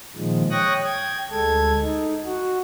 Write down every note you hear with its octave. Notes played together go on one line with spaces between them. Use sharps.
A#2 D#3 F3 G#3
C#5 G5 C#6 D#6 F#6 A#6
G5 G#6
D2 G#3 A4 G#6
D#4
F#4